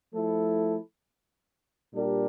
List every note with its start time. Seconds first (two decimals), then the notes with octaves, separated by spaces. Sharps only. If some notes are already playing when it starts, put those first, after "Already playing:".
0.13 F3 A3 E4 A4
1.93 A#2 G3 D4 G4 A#4